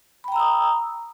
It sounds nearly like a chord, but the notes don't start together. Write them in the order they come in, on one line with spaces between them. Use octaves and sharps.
B5 G5 A#5 E6 D#6